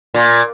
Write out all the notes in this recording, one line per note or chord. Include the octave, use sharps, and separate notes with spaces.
A#2